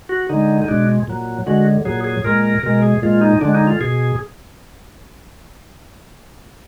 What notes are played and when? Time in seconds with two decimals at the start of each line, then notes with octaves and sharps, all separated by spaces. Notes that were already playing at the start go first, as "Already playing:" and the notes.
0.09 F#4
0.29 D3 G#3 D#4
0.62 D#4
0.68 B2 G#3 D4
1.08 A#2 F#3
1.46 D3 G#3 F#4
1.85 A#2 F#3 G#4
2.04 G#4
2.24 A#2 G#3 A#4
2.63 B2 G#3 A#4
2.82 G#4
3.02 A#2 G#3 F4
3.21 D#4
3.41 D3 G#3 D4
3.55 D#4
3.67 F4
3.81 B2 G#4